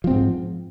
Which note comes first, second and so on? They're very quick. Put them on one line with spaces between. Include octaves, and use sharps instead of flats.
F3 C4 G#2